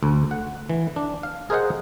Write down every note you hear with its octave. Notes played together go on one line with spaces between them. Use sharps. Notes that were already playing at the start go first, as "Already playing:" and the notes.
D2
F#5
E3
D4
F5
G#4 A#4 C5 D#5 F5 F#5